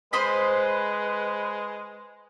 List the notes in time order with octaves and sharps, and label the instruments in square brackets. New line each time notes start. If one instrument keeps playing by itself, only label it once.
[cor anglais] G#3 [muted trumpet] B4 [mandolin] C5 D#5 B5